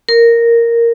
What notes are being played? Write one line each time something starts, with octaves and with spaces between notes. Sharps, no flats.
A#4